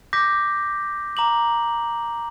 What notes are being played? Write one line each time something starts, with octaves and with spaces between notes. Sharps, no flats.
D6 G6 A#6 B6
A#5 D6 F#7